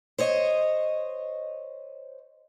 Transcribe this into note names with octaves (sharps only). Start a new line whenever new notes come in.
C5 C#5 D#5